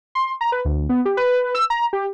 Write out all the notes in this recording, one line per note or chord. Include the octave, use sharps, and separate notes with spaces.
C6
A#5
B4
D2
B3
G4
B4
E6
A#5
G4